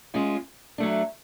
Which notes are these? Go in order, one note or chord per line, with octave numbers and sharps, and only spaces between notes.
G#3 C#4 F4
F#3 A3 D4